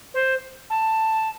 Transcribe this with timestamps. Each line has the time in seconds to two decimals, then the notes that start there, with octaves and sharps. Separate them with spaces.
0.14 C5
0.70 A5